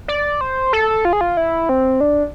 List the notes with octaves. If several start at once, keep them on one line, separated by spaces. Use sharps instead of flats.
D5
C5
A4
F4
G#4
F4
E4
C4
D4